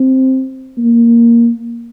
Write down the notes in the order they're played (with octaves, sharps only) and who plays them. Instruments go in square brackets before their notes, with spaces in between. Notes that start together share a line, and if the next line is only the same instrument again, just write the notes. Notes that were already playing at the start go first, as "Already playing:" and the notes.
Already playing: [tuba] C4
A#3